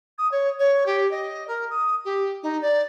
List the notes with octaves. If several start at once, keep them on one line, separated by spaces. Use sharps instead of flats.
D#6
C#5
C#5
G4
D#5
A#4
D#6
G4
D#4
D5